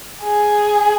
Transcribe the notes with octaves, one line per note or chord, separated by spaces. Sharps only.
G#4